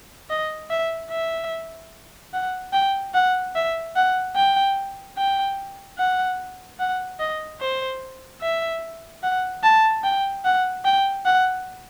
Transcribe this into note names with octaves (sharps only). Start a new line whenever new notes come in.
D#5
E5
E5
F#5
G5
F#5
E5
F#5
G5
G5
F#5
F#5
D#5
C5
E5
F#5
A5
G5
F#5
G5
F#5